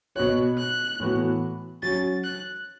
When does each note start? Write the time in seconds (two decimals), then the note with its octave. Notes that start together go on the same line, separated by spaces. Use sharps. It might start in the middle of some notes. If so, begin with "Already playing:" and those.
0.16 B2 B3 F#4 C#5 F#6
0.58 F#6
1.00 A2 E3 B3 F#4
1.83 F#3 C#4 F#4 A6
2.24 F#6